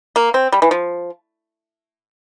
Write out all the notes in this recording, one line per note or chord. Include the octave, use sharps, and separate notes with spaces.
A#3
C4
G3
E3
F3